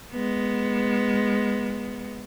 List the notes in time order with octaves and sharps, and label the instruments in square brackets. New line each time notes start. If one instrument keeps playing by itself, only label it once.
[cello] G#3 B3